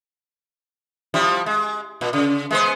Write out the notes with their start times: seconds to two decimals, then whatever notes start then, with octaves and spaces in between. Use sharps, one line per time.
1.14 F3 G3 E4
1.46 G#3
2.01 A#2
2.13 C#3
2.51 G#3 B3 C5